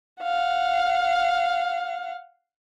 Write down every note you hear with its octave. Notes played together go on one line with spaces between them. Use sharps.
F5 F#5